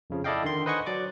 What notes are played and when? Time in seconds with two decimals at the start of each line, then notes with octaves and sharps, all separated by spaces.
0.10 F2 C#3 F3
0.24 E4 A4 D5 D#5 F5 G5
0.43 D3 D#3 C6
0.66 B4 C5 D#5 F#5 G#5 C#6
0.86 F#3 D5 D6